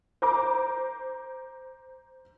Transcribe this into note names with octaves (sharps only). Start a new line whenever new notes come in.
C5 A#5 D6